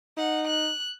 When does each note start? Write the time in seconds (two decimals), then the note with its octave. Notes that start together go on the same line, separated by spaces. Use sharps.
0.17 D#4 F#5
0.48 F#6